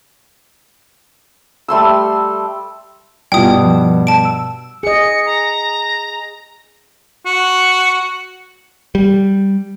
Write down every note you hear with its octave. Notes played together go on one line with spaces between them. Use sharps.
G3 A3 C6 E6
G2 B2 E4 F4 G5 G#5 D#6
F3
A5 D7
E6
G#4 D#5 C#7
A#5
F#4
G3